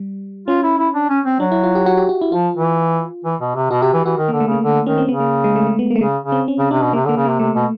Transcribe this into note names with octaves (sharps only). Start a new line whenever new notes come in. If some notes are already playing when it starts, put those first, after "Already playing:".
Already playing: G3
C#4 F4
E4
E4
D4
C#4
C4
F#3 D4
E4
F4
G4
F#4
G4
F#4
E4
F3 F4
E3
E3
B2
C3
B2 F#4
C3 G4
E3
E3 F#4
D#3
A#3
D3
A3
C#3 A#3
D3
D#3 C#4
C4
C#3 B3
A#3
G#3
A3
A3
B3
A#3
A3
C#3 G#3
C#3
C4
C#4
C#3
C3 D4
B2
C3 A#3
D3
A#3
C#3
A#3
C3
C3 A3
B2